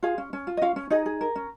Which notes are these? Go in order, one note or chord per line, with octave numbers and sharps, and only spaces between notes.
F4 G#4 F5
C#4
C#4
F4
D#5
C#4 F4 F5
C#4
D#4 G#4 D#5
G#4
A#4
C#4